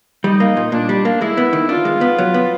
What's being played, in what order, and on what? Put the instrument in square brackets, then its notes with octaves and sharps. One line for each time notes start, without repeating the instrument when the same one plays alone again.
[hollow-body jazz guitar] G3 [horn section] D#4
[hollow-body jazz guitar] A#3
A#2
[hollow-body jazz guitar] A#2 [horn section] D4
[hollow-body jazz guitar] G3
A#3
[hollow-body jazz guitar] G#3 [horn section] E4
[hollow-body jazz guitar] B3
D#3
[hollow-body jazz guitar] D4 [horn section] F4
[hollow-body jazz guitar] G#3
B3
F#3
B3